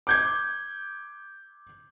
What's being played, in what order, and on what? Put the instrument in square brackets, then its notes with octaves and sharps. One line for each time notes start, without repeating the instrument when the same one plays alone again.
[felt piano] D6 G6 G#6